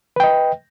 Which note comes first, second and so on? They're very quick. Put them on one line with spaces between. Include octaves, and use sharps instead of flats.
B4 G5 D#5